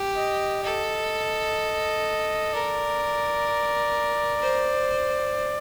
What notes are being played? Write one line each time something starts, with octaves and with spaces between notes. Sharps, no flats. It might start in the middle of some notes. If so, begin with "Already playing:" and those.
Already playing: G4
D#5
A4 D#5
A#4 D5
C5